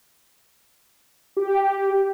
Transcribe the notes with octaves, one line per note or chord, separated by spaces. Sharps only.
G4